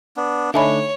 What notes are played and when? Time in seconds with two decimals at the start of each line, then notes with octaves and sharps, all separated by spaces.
0.17 B3 D4
0.54 D3 A3 D4 D#4 C#5 E5 G#5 B5